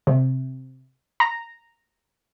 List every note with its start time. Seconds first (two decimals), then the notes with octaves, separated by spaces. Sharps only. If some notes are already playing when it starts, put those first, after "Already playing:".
0.07 C3
1.20 A#5